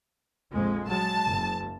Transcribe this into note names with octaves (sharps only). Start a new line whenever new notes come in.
A#1 F2 G#3
F#3 G#3 A5
F#1